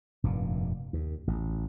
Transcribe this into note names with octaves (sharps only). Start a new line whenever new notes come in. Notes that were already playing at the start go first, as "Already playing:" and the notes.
F1 G2 A#2
D#2
A1